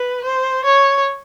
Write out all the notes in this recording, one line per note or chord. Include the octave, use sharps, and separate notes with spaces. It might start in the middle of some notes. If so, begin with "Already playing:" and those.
Already playing: B4
C5
C#5